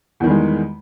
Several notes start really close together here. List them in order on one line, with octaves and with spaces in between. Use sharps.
E2 D#3 G3 G#3